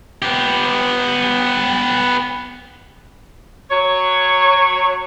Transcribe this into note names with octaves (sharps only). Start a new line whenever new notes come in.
B3 G4
F#3 C#5